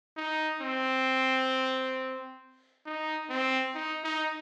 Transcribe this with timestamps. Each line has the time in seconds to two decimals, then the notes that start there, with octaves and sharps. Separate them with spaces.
0.17 D#4
0.61 C4
2.85 D#4
3.29 C4
3.75 D#4
4.04 D#4